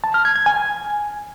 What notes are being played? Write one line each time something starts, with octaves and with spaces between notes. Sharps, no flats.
A5
F6
G#6
G#6
G#5